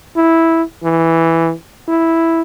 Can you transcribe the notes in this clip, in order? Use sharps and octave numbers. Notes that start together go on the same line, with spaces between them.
E4
E3
E4